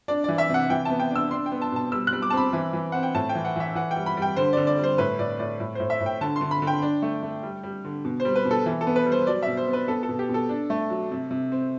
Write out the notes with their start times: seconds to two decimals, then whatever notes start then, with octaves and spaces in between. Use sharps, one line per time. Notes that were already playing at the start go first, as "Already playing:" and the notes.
0.08 D4 D5
0.24 E3 D5
0.38 E5
0.49 C3 F#5
0.70 E3 G5
0.85 B3 A5
1.00 G5
1.10 D4
1.16 E6
1.31 D4 C6
1.46 G5
1.52 B3
1.62 A5
1.72 B2 A5
1.92 G3 E6
2.07 F#6
2.13 G3
2.22 D6
2.30 A5
2.33 C4 B5
2.53 E3
2.73 E3
2.92 C4 F#5
3.03 G5
3.14 A2 A5
3.29 G5
3.35 E3
3.45 F#5
3.56 E3 E5
3.75 E3 F#5
3.91 G5
3.96 G3
4.06 B5
4.17 G3 G5
4.36 D3 C5
4.53 D3 D5
4.67 D5
4.78 G3
4.84 C5
4.98 A2 B4
5.19 A2 D5
5.39 A2 D5
5.60 A2
5.75 A2 C5
5.90 E5
6.00 A2
6.06 G5
6.21 D3 A5
6.36 C6
6.41 D3
6.51 B5
6.62 D3
6.67 G5
6.82 D4
7.02 A3
7.23 A3
7.43 G3
7.63 G3
7.85 D3
8.05 B2
8.20 C5
8.25 G3
8.36 B4
8.45 B2
8.51 A4
8.66 E3
8.81 A4
8.87 B3
8.96 B4
9.06 G3
9.12 C5
9.27 F#3 D5
9.43 B2 E5
9.57 C5
9.67 B3
9.73 B4
9.88 B3 A4
10.03 A4
10.09 B2
10.19 G4
10.29 B2 A4
10.49 D4
10.70 A3
10.90 F#3
11.11 C3
11.31 C3
11.52 C4